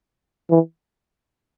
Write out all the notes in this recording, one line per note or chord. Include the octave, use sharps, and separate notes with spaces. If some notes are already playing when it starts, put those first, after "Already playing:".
E3